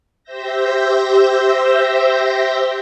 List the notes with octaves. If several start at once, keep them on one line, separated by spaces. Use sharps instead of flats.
G4 C5 E5 E6 G6 A#6